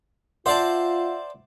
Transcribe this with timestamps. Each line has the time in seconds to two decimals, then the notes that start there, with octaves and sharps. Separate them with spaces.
0.46 F4 C5 D5 E5 F#5 A5